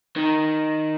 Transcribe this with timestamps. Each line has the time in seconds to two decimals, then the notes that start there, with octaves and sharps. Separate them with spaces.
0.16 D#3